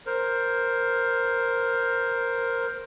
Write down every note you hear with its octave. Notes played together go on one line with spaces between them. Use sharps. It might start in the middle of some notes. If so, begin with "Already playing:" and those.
A#4 C5